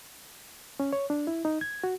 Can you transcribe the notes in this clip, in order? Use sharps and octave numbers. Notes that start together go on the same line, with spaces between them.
C#4
C#5
D4
E4
D#4
G#6
F#4